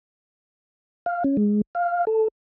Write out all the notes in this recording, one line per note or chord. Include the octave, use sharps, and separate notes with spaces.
F5
C#4
G#3
F5
A4